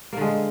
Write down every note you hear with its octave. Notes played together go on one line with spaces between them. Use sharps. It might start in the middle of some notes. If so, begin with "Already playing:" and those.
D3 G#3 A#3